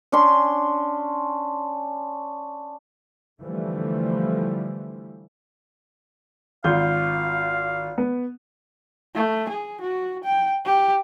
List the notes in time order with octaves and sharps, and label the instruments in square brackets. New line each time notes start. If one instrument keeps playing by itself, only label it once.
[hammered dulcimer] C#4 D4 G#5 C6
[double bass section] D3 E3 F3 G3 A3
[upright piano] G#1 F4 G6 [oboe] F5
[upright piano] B3
[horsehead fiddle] A3
G#4
F#4
G5
G4